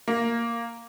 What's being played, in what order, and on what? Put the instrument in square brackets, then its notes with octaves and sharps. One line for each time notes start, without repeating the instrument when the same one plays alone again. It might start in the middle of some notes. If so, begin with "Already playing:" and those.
[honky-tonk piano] A#3